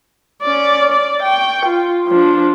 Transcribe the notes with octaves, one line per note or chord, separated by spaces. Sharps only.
C#4 D5
D5
G5 C#6
F4
F3 D4